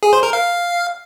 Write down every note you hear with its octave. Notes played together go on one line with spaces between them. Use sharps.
G#4
C5
A#4
F5